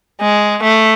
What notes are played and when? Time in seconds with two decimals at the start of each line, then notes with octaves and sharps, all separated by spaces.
0.21 G#3
0.62 A3